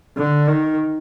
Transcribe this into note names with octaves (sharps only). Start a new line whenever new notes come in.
D3
D#3